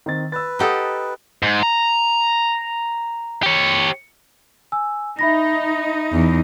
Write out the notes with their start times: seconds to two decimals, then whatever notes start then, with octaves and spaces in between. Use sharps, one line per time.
0.06 D#3 C4 A6
0.32 B4 E6 A6
0.59 D#4 G4 A4 D#5 F#5 D#6
1.43 G#2
1.63 A#5
3.43 G4 C#5
4.72 G#5 E6
5.19 D#4 E5 B5 A#6
6.12 E2